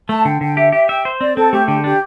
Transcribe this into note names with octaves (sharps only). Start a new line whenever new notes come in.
A3 A5
D3 G5
D3 G5
G4 E5
G4 E5
E5 G5
C5
C4 D5
C4 A4
A3 G4
D3 G4
D4 G4